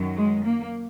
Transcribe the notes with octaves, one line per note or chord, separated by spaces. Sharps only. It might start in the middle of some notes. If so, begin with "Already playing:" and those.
Already playing: F#2 D#3 F#3
G#3
A#3